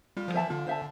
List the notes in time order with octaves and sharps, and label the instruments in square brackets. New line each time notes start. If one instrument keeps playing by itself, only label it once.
[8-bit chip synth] G3 [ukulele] F4
[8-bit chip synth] F3
[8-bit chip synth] E3 [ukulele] C5 E5 A5
[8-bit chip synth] D3 [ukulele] F4
[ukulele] C5 E5 A5